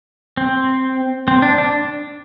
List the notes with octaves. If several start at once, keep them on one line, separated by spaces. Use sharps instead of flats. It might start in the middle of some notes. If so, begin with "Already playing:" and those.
C4
C4
D4
D4